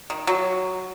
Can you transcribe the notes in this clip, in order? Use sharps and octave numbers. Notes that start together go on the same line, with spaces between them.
D#3
F#3